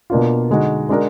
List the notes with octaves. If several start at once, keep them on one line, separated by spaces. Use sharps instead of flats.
B2 A#3 D4 F4
D3 G#3 D#4 F#4
G#3 D4 F#4 A#4